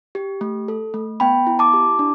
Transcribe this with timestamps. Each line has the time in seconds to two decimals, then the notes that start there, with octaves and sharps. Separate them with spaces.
0.15 G4
0.41 A3
0.68 A4
0.94 A3
1.20 B3 G5 B5
1.47 E4
1.59 A5 D6
1.73 G4
1.99 D4